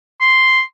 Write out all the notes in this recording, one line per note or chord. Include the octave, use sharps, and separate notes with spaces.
C6